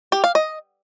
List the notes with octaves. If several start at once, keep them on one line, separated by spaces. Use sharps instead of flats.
G4
F5
D#5